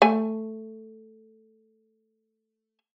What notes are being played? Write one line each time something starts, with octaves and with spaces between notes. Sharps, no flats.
A3 G#5